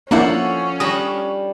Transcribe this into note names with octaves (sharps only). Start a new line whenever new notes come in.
F3 A#3 C#4 D4 E4 A4 F#5
G3 D4 D#6 A#6